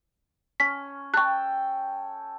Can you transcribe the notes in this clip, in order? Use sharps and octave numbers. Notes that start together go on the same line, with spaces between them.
C#4 B6
A4 G5 C#6 F#6